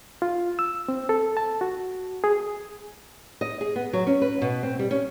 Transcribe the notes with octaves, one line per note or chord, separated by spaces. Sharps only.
F4
E6
C4
A4
A5
F#4
G#4
D#5
G#4
B3
F#3
C#4
B4
B2
C4
G3
C#4